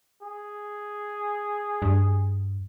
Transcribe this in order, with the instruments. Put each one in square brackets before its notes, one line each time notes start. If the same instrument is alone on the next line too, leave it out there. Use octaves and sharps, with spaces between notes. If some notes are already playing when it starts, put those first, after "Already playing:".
[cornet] G#4
[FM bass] G2